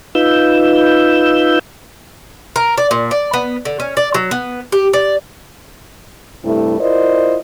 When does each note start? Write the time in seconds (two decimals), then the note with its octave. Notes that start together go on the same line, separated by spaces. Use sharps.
0.15 D#4 F4 B4 E6 G6
2.56 A#4
2.78 D5
2.91 A#2
3.11 D5
3.33 B3
3.65 D3
3.80 C#4
3.97 D5
4.14 F#3
4.31 B3
4.72 G4
4.93 D5
6.45 G2 C3 A3 E4
6.80 E4 F4 A#4 C5 D5 D#5